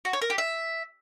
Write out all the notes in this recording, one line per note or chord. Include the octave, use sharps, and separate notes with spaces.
F#4
C#5
A#4
G4
E5